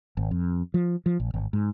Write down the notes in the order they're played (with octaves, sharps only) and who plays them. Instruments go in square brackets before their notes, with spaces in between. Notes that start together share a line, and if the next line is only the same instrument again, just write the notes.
[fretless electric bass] G#1
F2
F3
F3
A#1
G#1
G#2